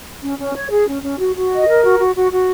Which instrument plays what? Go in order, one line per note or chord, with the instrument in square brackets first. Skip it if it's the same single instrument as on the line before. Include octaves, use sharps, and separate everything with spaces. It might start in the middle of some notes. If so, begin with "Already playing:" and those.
[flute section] C#4
C#4
C#5
G#4
C#4
C#4
F#4
F#4
D#5
A#4
F#4
F#4
F#4
F#4